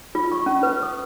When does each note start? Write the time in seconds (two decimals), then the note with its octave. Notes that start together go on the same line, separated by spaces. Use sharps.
0.15 F4
0.32 C#6
0.46 C#4
0.63 B4
0.83 D#6